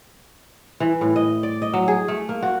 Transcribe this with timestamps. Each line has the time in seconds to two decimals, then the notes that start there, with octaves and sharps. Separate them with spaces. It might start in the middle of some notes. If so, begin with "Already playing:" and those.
0.80 E3
1.01 A2
1.16 D#5
1.43 D5
1.62 D#5
1.73 F#3
1.88 G#4
2.08 A3
2.29 A#3
2.42 F#4